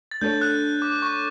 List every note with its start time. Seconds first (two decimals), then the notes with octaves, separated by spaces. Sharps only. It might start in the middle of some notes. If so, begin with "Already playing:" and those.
0.11 A6
0.21 A3 D4 A4 C#5 G6
0.41 F#6
0.82 D6
1.02 C#6